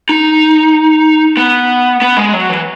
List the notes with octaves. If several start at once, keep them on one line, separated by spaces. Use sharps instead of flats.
D#4
B3
B3
G#3
F#3
E3